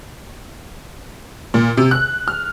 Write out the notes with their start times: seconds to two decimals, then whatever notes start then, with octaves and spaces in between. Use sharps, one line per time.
1.54 A#2
1.77 C3
1.91 F#6
2.28 F6